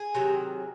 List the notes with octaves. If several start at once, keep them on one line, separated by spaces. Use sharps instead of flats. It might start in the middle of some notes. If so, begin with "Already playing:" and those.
Already playing: G#4
C3 D#3 F#3